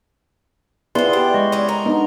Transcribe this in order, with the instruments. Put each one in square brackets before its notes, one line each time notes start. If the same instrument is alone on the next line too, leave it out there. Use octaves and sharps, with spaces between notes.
[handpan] B3 E4 G#4 [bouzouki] F4 C5 [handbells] B4 D5 C6
[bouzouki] D4 [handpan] G4
[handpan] G#3 [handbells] D#5 C6 C#6
[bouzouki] C#4 E4 D5
A#4
[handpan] B3 D4 D#4